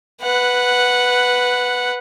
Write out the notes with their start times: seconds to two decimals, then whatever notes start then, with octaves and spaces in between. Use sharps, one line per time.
0.22 B4 F#5